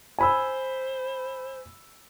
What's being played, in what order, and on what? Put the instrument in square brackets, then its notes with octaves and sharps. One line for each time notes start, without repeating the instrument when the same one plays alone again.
[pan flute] C5 [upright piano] G#5 B5 E6